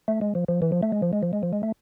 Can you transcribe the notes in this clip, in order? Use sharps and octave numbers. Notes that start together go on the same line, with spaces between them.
A3
G#3
F3
F3
E3
F3
A3
G#3
F3
G#3
F3
G#3
F3
G#3
A3